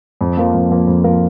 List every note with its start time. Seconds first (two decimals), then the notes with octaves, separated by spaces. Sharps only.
0.21 F2
0.37 F3 A#3 F4 A#4
0.54 F2
0.71 F3 A#3 F4 A#4
0.87 F2
1.04 F3 A#3 F4 A#4